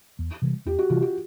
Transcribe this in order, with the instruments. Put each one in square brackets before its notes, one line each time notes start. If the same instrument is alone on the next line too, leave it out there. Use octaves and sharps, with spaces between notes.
[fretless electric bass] E2
C3 E3 G3
[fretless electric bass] E2 [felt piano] G4
[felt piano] F#4
[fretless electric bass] C3 E3 G3 [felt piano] F4
[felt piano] F#4